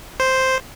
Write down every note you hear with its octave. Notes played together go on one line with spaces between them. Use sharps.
C5